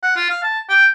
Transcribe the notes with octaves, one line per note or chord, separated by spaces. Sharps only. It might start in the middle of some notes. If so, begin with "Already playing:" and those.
F#5
F4
F5
A5
G5